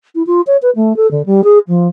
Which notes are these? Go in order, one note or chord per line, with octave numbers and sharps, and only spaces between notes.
E4
F4
C#5
B4
A3
A4
D3
G3
G#4
F3